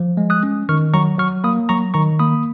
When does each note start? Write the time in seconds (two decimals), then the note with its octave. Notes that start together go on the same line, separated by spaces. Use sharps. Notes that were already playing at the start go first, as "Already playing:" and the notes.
Already playing: F3
0.17 G#3
0.30 D#6 F#6
0.43 C#4
0.69 D#3 C#6 F6
0.94 F#3 A#5 C#6
1.18 F#3 C#6 F6
1.44 A#3 B5 D#6
1.69 F#3 A#5 C#6
1.94 D#3 A#5 C#6
2.19 A#3 B5 D#6